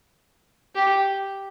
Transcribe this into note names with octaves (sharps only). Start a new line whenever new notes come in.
G4